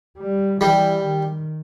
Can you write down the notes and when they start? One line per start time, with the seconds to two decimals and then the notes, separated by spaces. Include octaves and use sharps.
0.18 G3
0.61 E3 G3
1.05 D#3